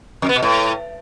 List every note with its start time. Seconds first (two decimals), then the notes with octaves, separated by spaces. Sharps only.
0.22 F2
0.29 B3
0.36 B2
0.43 A2